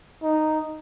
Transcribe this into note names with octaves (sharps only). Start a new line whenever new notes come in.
D#4